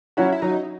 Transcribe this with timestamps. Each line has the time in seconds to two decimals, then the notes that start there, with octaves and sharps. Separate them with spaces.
0.17 F#3 C#4 E4 F#4
0.32 E4
0.42 F#3 D#4